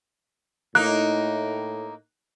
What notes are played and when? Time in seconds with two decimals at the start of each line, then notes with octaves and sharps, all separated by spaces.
0.75 A2 A#3 D#4 F#6